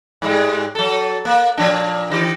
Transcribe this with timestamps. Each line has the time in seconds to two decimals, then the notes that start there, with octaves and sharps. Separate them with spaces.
0.22 G#2 G3 G#3
0.75 F#3 A4
1.25 A#3
1.57 A#2 F3 D4
2.10 D#3 E3 G4